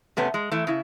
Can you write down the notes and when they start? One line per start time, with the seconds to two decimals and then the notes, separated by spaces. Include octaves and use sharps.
0.17 C3 A3 B3 C#4
0.34 G#3
0.52 E3 A3
0.67 C#3 E4